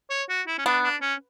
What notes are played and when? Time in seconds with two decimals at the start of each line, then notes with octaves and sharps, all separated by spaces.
0.10 C#5
0.29 F#4
0.47 E4
0.58 C#4
0.65 B3 D4
0.84 D4
1.01 C#4